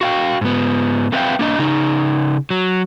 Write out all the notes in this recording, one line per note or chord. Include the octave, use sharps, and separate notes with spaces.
F#4 F5 G5
G#2 B3
A3 C4 B4 E5 F5 G5
A#3 D4 D#5
C#3 D#4
F#3